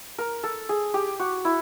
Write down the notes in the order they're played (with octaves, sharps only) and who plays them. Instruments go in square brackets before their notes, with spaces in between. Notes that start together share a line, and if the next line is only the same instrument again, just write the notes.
[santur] A#4
A4
G#4
G4
F#4
E4